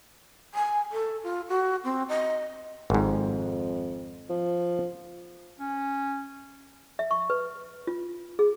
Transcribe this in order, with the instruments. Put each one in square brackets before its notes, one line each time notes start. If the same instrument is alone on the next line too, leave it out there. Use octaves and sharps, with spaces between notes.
[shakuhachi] G#5
A4
F4
F#4
C4
D#5
[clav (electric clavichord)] G#1 G#2 [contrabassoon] F2
[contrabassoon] F3
[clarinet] C#4
[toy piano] E5
C#6
B4
F4
G#4